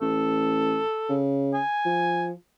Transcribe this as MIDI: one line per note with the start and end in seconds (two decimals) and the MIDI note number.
0.02 0.80 33
0.02 1.20 69
1.09 1.59 49
1.54 2.27 80
1.85 2.33 53